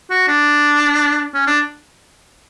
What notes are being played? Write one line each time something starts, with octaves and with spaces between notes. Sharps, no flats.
F#4
D4
C#4
D4